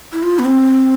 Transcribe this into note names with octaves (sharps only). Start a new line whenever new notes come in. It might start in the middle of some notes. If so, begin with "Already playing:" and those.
E4
F4
B3
C4